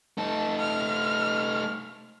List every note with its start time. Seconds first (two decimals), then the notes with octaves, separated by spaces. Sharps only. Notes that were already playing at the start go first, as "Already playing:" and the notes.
0.18 A3 D#4 A5
0.61 F6